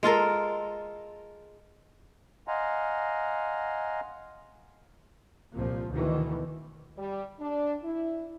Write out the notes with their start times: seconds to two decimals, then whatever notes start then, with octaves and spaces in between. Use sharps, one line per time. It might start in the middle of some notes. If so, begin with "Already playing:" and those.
0.03 G#3 F4 A4 A#4
2.48 D#5 F5 F#5 G#5 A#5 C6
5.53 C2 A#2 F3
5.91 D2 B2 D#3 E3
6.97 G3
7.40 D4
7.82 E4